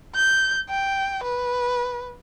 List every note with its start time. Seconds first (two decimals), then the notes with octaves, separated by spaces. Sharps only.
0.15 G6
0.69 G5
1.23 B4